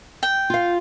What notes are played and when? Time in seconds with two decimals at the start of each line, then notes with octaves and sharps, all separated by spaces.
0.23 G5
0.50 F4 F5